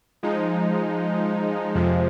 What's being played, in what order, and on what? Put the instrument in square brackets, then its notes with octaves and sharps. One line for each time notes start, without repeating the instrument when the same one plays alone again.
[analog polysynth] F3 G#3 D#4
F2 C3 F3 G#3